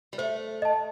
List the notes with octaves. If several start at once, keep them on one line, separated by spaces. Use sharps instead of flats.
G3
A3 C5
D#5 A5